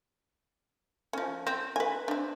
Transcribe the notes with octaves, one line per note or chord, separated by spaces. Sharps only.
F3 C#4
C4
B4 G#5
C4 D4